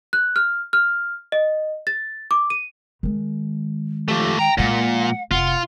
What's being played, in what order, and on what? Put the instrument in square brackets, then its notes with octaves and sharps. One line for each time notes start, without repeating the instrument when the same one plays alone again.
[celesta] F#6
F6
F6
D#5
A6
D6
D#7
[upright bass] D#3 G#3
[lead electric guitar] F3 A3 [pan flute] G4
[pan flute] G5 [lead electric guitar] A#5
[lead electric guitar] A#2 [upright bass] F3 G#3 [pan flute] F#5
[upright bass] F1 [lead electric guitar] F4 [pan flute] F#5